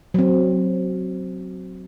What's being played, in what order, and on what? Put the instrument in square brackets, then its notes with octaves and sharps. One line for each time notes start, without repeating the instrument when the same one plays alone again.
[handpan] F#3 C4